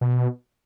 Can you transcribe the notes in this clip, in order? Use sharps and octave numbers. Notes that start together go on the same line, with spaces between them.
B2